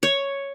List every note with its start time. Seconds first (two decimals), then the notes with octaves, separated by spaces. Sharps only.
0.03 C#5